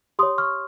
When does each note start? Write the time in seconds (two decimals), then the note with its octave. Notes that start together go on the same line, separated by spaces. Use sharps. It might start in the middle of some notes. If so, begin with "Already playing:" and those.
0.19 G4 C#5 C6 D#6
0.38 C#6 F6